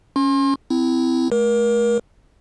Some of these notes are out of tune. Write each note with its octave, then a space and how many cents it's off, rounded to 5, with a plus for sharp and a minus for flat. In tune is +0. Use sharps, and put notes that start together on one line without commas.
C#4 +0 C6 +35
C4 -25 E4 +5
A3 -40 A#4 +30